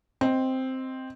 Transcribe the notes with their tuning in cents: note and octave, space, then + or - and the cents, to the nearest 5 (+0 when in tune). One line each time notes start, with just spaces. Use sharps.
C4 +0 D#5 +0